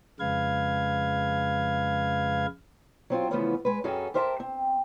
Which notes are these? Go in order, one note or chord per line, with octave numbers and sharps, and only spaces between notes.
F2 C#3 G#3 B4 F5 G#6
F#3 C4 F4
C#3 E3 F3 A3 B3 C#4
G#3 B4
F#2 F#3 C#4 G#4 A4
G4 A#4 C5 E5 F5 A5
C4